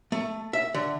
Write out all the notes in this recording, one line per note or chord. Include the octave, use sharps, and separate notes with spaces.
A3
E5
D3